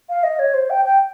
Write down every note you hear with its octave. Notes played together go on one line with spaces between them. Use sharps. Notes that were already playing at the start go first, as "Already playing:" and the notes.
F5
D#5
C#5
C5
G5
G5